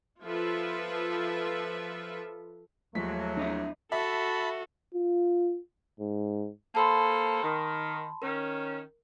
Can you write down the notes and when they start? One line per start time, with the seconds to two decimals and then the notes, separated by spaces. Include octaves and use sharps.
0.22 F3 F4 A4 B4 E5
2.95 D#2 F3 F#3 G#3 A3 B6
3.37 D4 D#5 E5
3.92 F#4 A4 E5 A5 B5
4.94 F4
6.00 G#2
6.75 A#3 A4 C5 A5 B5 C6
7.43 D#3
8.22 D#3 C#4 A#4